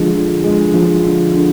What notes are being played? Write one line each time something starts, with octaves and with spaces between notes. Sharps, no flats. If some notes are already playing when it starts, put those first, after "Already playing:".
Already playing: D3 F3 G#3
D3
G#3
F3
D3
D3